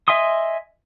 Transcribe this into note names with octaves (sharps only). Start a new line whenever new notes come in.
D#5 E5 G#5 C6 D#6